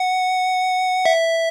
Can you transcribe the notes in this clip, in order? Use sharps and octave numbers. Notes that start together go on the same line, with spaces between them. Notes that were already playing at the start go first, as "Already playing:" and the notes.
Already playing: F#5
E5